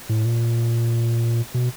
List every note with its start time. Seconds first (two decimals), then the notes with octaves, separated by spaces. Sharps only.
0.09 A2
0.26 A#2
1.54 B2